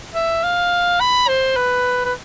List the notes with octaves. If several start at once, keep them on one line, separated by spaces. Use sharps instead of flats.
E5
F5
B5
C5
B4
B4